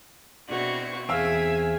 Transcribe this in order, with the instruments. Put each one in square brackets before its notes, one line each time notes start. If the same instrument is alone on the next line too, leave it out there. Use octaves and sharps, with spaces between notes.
[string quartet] B2 C4 E4 [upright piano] D4 [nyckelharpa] F#4 C#6
[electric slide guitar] E2 C4 [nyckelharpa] G#4 [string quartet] E5 G#5 [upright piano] F5 E6